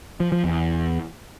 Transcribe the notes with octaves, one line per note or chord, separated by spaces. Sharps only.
F3
F3
E2